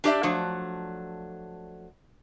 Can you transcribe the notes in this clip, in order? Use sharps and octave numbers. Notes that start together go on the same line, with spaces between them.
D4 G4 D5 E5
F3 F#3 A3 D4